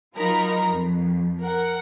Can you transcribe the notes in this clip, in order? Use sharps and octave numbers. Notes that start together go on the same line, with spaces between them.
F#3 D#4 F4 A#4 A#5 B5
F2
A#4 F#5